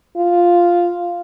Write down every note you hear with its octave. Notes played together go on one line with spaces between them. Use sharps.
F4